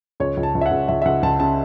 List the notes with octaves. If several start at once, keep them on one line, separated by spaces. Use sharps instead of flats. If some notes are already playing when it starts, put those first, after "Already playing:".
C#2 C#5
C#2
A5
C#2
E5
F#5
C#2
C#2 E5
E5
C#2 F#5
C#2 A5
C#3 A5